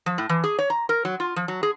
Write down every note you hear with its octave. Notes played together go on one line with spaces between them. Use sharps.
F3
A2
E3
G#4
C#5
A#5
A#4
F#3
F4
F3
F#3
G#4